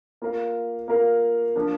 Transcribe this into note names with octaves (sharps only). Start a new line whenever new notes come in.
A#3 F4 A#4 F5
A#3 F4 A#4 F5
F3 A#3 D4